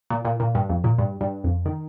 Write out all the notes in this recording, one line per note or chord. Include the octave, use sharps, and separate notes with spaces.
A#2
A#2
A#2
G2
F2
A#2
G2
G2
F2
D#3